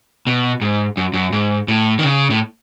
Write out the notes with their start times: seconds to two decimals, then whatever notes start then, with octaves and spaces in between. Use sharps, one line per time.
0.27 B2
0.61 G#2
0.97 F#2
1.14 F#2
1.33 G#2
1.68 A2
1.99 D#3
2.03 C#3
2.30 A2